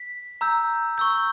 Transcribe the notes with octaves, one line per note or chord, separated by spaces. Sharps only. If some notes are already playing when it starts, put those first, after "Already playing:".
Already playing: B6
A#5 E6 G6
C#6 E6 G6